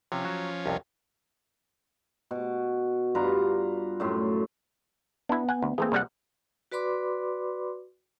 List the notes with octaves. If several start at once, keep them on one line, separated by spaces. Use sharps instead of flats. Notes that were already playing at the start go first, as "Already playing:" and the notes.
C3 F3 C#4
F#3
C2 F2 C3
B2
G2 F4 B4 A#5
F#2 A2 C6
B3 D4 E4
F#5 G#5
D2
E3 A3 A#3 C4 G#4
C2 G3 F#5
F#4 B4 D5 B5 C6 D6